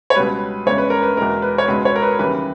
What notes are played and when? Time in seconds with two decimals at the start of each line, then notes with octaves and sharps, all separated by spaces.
0.10 C#5
0.15 C#2 B2 G3 B4
0.66 E2 C#3 G#3 C#5
0.78 B4
0.90 A#4
1.03 B4
1.17 E2 B2 G#3 A#4
1.42 B4
1.58 C#5
1.68 C#2 B2 G#3 B4
1.85 C#5
1.96 A#4
2.02 B4
2.19 D#2 C#3 E3 G3 B4